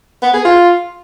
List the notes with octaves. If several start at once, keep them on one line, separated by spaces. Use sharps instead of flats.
B3
G#4
F4